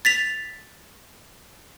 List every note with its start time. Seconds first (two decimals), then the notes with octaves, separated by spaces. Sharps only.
0.05 A6 B6 F7